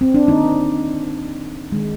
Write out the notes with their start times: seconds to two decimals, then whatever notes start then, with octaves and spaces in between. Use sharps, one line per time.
0.01 C4
0.14 D4
0.28 D#3 A#3 D#4
1.72 D#3 G#3